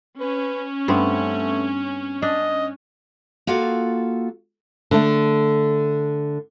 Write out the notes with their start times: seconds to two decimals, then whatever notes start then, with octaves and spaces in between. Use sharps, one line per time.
0.20 C#4 B4
0.88 G2 A3 B3 C4
2.22 D4 D#5
3.47 A#3 F4 F#4 A4 F5
4.91 D3 A3